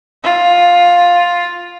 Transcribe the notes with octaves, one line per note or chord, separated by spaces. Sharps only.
F4